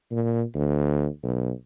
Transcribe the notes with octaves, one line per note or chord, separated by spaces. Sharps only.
A#2
D2
B1